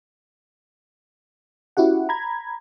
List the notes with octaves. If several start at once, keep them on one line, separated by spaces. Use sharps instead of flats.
C#4 E4 F#4 G4 F#5
A#5 B5 G#6